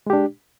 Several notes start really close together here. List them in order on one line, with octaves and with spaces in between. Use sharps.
G#3 G4 D4